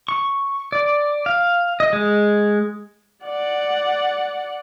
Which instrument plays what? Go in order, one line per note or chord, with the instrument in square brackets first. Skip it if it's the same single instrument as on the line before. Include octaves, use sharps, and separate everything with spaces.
[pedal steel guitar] C#6
D5
F5
D#5
G#3
[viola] D5 F#5